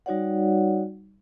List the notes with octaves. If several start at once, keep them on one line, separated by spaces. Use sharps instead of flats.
G3 D#4 F#4 C#5 D5 F#5